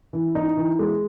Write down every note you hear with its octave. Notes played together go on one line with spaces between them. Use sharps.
E3
D#4
E3
G#3